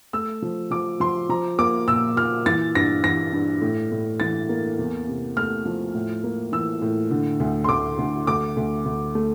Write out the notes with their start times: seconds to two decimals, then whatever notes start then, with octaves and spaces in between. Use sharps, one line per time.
0.13 A3 E6
0.42 F3
0.71 F3 D6
1.00 F3 C6
1.29 F3 A#5
1.58 A#3 D6
1.88 A#2 E6
2.17 A#2 F6
2.46 E3 A6
2.75 G2 A#6
3.04 E3 A#6
3.33 G2
3.61 A2
3.92 A2
4.20 E3 A6
4.49 A#3
4.79 E2
5.08 C3
5.37 A3 F6
5.65 F3
5.94 A2
6.24 A#3
6.52 E3 E6
6.82 A2
7.11 D3
7.40 D2
7.64 C6
7.69 D2 D6
7.98 D2
8.27 D2 D6
8.57 D2
8.85 D2
9.15 A3